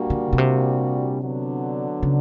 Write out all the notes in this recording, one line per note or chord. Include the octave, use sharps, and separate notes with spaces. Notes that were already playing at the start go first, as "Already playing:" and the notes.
Already playing: A#2 G3 A#3 D4 F#4
D3
B2
C3
D3 F#3 B3 D4
C#3